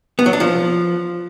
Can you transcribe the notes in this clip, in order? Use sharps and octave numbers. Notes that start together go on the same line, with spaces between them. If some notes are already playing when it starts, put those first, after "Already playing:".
B3
F#3
D4
F3